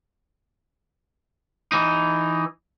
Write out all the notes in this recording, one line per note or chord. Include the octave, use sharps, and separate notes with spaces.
E3 D#4